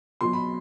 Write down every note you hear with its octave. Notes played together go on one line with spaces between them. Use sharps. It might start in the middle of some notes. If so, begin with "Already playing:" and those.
B2 F#3 C6
B5